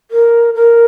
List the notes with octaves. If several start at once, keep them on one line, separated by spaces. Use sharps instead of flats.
A#4
A#4